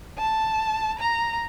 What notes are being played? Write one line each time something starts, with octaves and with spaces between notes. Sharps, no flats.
A5
A#5